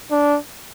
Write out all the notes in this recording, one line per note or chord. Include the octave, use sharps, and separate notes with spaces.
D4